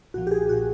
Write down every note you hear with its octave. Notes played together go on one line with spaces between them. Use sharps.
B1 A#2 F3 F#4
G4
G#4
A#2 F3 F#4